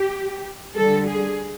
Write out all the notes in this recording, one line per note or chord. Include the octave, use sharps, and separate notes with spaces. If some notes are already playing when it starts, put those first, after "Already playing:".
Already playing: G4
D3 G3 A4
G#4